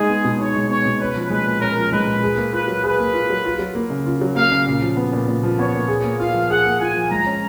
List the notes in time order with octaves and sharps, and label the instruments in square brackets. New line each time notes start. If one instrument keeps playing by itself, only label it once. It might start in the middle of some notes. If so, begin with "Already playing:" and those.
Already playing: [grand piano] G#3 D#4 [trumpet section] G#4
[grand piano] B3
B2
[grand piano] D#4 [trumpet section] C#5
[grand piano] G#3
[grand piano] B3 [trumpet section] C#5
[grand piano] B2
[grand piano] C#4 [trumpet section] B4
[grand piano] F3
[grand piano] G#3 [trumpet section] B4
[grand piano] A#2
[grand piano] C#4 [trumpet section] A#4
[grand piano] F3
[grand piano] G#3 [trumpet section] B4
[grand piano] A#2
G#4
A#3
[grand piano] F4 [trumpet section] B4
[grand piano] F#3
[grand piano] G#4 [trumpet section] B4
[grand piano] A#3
F4
F#3
F4
F#3
A#3
C#3
F4
F#3
[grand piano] A#3 [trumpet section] F5
[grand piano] C#3
A#2
F3
B3
A#2
A#2
F3
[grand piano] B3 [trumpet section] C#5
[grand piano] A#2
G#4
A#3
[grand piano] F4 [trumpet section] F5
[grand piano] F3
[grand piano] G#4 [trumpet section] F#5
[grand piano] A#3
[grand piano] F4 [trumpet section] G#5
[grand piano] F3
[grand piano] G#3 [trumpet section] A#5
[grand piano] C#4